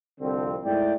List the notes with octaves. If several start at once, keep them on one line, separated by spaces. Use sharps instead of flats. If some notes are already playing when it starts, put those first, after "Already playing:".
C2 F2 D3 C4
G#2 A3 E4 D5 G5